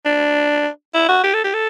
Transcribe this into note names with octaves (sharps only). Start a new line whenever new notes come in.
D4
E4
F#4
G4
A4
G4
A4